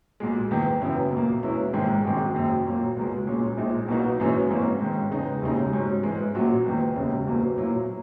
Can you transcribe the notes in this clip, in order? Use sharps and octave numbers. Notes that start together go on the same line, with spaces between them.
B1 A#2 G#3
F#1 E2 D#3
F#2 C#3 E3 B3 E4
B1 A#2 A#3
E2 B2 G#3 C#4 E4
A#1 G#2 D#3 G#3
G#1 F#2 D#3 G#3
F#1 F#2 D#3
A#2 F#3 A#3
C#2 B2 G#3
B1 A#2 G#3 C#4
A#1 A#2 G#3 D#4
B1 B2 A#3 D#4 F#4
F#1 F#2 E3 G#3 C#4
G#1 G#2 E3 A#3 C#4
G#2 D#3 G#3 C#4
E2 C#3 G#3 D#4
E1 D#2 C#3 G#3 D#4
G#2 F#3 C#4
G#2 E3 G#3
A#1 A#2 F#3 C#4 F#4
F#1 E2 D#3
E1 D#2 C#3
F#1 E2 B2 F#3 A#3
A#2 F#3 A#3 E4